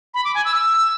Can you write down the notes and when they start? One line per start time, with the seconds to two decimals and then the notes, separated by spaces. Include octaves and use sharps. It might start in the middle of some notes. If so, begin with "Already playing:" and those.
0.14 B5
0.25 D6
0.35 G#5
0.45 E6
0.55 E6